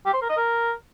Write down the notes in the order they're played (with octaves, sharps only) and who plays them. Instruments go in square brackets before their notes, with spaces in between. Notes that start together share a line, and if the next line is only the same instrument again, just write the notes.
[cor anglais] G4
C5
A#4
D#5
A#4